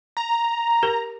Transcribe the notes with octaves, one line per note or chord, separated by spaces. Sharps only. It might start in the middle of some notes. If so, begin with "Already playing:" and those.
A#5
G4 A#4